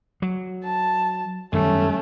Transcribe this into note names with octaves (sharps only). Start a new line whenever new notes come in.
F#3
A5
F#2 D#3 G3 A3 C#4